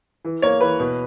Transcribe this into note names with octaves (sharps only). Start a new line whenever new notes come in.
E3
A#3 C#5
E3 B4
B2